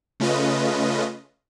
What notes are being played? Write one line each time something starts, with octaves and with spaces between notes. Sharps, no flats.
C#3 A3 C#4 F4 B4 D#5